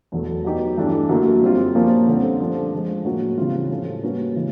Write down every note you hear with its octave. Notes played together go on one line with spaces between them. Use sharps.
E2 B2 F#3 A3
F#3 B3 D#4 G4
G2 E3 A3 D4
F#2 D3 F#3 A#3
G3 C4 F4
A#2 F3 A#3 C#4
D3 G3 C4
F3 A3 D4
D3 F3 G#3
A2 F#3 A#3 C#4 F#4
C#3 E3 G3 C4 F4
A2 F3 A3 C#4 F4
G3 A#3 C#4 F#4 B4
C#3 E3 G#3